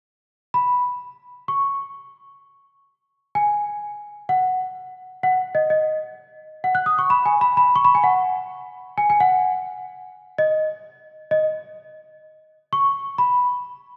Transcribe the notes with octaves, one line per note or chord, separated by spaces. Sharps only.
B5
C#6
G#5
F#5
F#5
D#5
D#5
F#5
F#6
D#6
C#6
B5
G#5
B5
B5
C#6
B5
G#5
F#5
G#5
G#5
F#5
D#5
D#5
C#6
B5